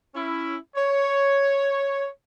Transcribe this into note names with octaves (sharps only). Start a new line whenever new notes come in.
C#4 E4
C#5